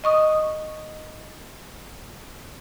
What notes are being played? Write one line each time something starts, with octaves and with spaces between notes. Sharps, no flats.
D#5 C#6 D#6